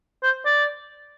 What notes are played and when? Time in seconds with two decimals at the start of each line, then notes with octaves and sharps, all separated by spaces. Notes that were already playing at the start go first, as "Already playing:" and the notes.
0.23 C5
0.45 D5